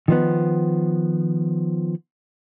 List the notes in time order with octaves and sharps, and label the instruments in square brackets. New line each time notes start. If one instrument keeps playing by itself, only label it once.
[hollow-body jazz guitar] D#3 F3 B3